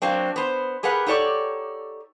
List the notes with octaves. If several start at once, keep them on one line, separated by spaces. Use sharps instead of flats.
F#3 A#3 C4 D4
B3 C5
G4 G#4 A#4 B4 F#5
D#4 G4 A4 C#5 D5